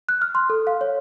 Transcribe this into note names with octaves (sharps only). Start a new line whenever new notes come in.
F#6
F6
C6
A4
F5
C#5